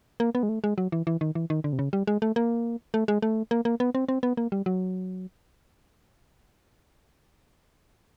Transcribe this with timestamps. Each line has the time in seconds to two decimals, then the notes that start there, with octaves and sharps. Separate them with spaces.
0.20 A#3
0.35 B3
0.43 G#3
0.49 A3
0.64 G#3
0.78 F#3
0.92 E3
1.07 E3
1.21 D#3
1.35 E3
1.50 D#3
1.64 D3
1.73 C3
1.79 C#3
1.93 G3
2.07 G#3
2.22 A3
2.36 A#3
2.94 A3
3.08 G#3
3.22 A3
3.51 A#3
3.65 A#3
3.80 B3
3.95 C4
4.09 C4
4.23 B3
4.37 A#3
4.52 G3
4.66 F#3